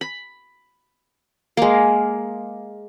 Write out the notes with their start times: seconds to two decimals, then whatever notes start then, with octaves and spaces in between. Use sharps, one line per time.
0.01 B5
1.57 G#3 A#3